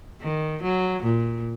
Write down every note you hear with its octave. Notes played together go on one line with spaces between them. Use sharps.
D#3
F#3
A#2